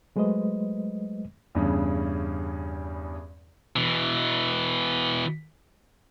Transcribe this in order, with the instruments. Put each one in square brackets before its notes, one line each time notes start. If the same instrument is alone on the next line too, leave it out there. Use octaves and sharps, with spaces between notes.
[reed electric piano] F#3 G#3 A3 B4 C5 D#5
[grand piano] E2 G2 C#3
[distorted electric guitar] B2 E3